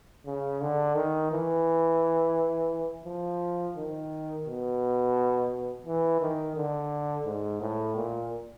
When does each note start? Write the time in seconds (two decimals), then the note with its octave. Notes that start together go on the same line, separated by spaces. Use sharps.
0.26 C#3
0.61 D3
0.95 D#3
1.31 E3
3.05 F3
3.76 D#3
4.45 B2
5.86 E3
6.21 D#3
6.56 D3
7.25 G#2
7.61 A2
7.96 A#2